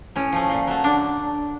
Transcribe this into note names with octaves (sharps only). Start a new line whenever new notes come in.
A2 C#4
F3 A3
A#2
F#3 A3
D3 D4